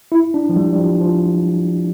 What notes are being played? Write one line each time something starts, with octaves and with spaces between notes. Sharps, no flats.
E4
D4
F3
G3
G3
F3
F3